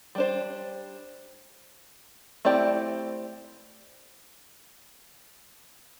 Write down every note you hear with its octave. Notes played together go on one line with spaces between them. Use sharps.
G3 D4 C5
A3 C4 E4 G4 D5